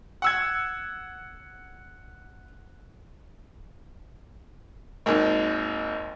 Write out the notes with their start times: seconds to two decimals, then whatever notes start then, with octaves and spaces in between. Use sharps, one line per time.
0.22 F#5 E6 G#6
5.06 G#1 D#2 G#2